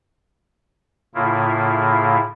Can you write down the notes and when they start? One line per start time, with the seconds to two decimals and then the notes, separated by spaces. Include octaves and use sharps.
1.15 A2 C#3 A#3 E4 F4